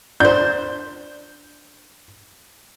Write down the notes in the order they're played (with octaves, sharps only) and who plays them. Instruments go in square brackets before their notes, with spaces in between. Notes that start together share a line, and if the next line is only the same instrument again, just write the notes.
[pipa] D4 C5 [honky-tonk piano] G6